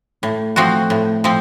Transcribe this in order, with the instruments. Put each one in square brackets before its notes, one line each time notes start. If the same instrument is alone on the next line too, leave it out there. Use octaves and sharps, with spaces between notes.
[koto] A2 [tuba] A3
[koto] F3 C4 F#4
A2
F3 C4